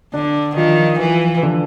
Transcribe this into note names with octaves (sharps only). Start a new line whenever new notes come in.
D3 D4
D#3 F3
E3 F3
D3